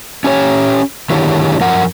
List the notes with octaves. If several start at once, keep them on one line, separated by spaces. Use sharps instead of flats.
C#4 G4 C#5
D3 D#3 E4 G4 G#4 C#5
F#2 F3 A#4 F#5